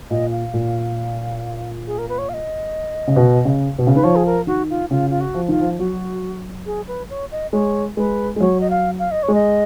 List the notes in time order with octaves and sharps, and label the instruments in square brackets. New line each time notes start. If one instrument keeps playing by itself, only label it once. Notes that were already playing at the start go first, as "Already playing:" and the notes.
[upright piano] A#2 [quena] D#5
[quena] F5
[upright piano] A#2
[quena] G#4
A#4
B4
C#5
F5
D#5
[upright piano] C#3
B2
C#3
B2
C#3
[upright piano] D#3 [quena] B4
[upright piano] F3 [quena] C#5
[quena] G#4
A#4
[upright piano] D#3 [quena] F#4
[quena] F4
[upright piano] C#3 [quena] F4
[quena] F4
F#4
[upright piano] F3
[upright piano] D#3 [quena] F4
[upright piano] F3
[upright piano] F#3 [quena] F#4
[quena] G#4
B4
C#5
D#5
[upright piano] G#3 [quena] C#5
[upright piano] G#3 [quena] B4
[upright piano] G#3
[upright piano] F#3 [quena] C#5
[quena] D#5
F5
F5
D#5
C#5
[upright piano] G#3
[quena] D#5